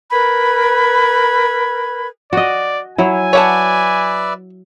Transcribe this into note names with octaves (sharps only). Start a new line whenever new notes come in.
A#4 B4 B5 G#6
F#4 D5 D#5
F#3 E4 G#5
B4 C#5 D5 E5 F#5 A5